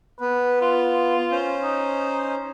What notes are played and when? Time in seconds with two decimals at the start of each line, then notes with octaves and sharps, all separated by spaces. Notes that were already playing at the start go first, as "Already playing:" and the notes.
0.21 B3 B4
0.61 F4
1.31 C#4 C5
1.63 D#4